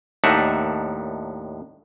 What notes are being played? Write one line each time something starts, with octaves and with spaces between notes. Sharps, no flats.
D#2 A2 D4 D#4 E5 F#5